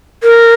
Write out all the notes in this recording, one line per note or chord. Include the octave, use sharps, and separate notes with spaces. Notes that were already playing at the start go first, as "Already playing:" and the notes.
A#4